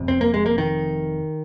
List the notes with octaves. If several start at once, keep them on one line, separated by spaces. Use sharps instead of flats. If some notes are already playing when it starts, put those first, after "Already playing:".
Already playing: F1 F2 C3
C4
A#3
G#3
A#3
D#3